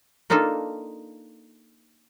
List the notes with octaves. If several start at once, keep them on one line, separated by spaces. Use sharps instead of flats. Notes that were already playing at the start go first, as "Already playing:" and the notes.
A#3 D4 D#4 F4 A4